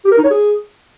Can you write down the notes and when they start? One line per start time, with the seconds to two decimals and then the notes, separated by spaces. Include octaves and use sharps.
0.05 G4
0.11 A#4
0.18 D#4
0.24 C#5
0.31 G#4